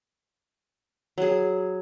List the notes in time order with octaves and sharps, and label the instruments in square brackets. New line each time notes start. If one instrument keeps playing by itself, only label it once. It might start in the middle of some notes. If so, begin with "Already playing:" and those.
[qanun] F#3 G#4